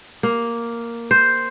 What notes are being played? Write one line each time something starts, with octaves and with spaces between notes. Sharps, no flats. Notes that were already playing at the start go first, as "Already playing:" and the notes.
A#3
C5